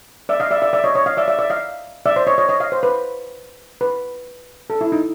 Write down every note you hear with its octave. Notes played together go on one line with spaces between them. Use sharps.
D5 E5
D#5 F5
D5 E5
D5 E5
D5 E5
C#5 D#5
C#5 D#5
D#5 F5
D5 E5
D5 E5
D5 E5
D#5 F5
D5 E5
C5 D5
C#5 D#5
C#5 D#5
C#5 D#5
D#5 F5
C5
B4
B4
A4
E4
D#4